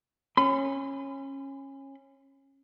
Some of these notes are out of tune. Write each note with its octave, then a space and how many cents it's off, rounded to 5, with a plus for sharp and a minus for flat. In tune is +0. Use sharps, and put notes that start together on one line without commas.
C#4 -20 B5 +40